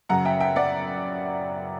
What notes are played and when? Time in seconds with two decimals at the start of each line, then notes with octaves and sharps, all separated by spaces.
0.09 F#2 C#3 F#3 F#5 A#5
0.25 E5 G5
0.40 E5 G5
0.56 D5 F#5